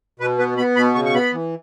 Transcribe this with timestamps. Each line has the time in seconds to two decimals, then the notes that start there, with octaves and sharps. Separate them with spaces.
0.19 B2 B4
0.39 B3 B4
0.57 B3 B5
0.76 B2 B5
0.95 C#3 C#6
1.05 C#6
1.14 B3 B5
1.33 E3